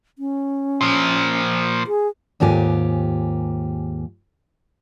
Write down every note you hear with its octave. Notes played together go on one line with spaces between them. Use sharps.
C#4
A#2 F3
G#4
D#2 G#2 F4 G4 G#5